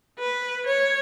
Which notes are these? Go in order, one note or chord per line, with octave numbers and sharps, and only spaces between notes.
B4
C#5